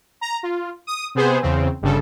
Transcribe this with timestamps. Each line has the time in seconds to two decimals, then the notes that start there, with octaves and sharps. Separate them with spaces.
0.21 A#5
0.43 F4
0.87 D#6
1.15 C3 B3 G#4 C5
1.42 E2 C#3 C4
1.82 G1 G2 C#3 A4